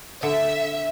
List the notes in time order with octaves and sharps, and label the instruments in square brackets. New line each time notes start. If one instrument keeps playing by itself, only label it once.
[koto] D3 [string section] E5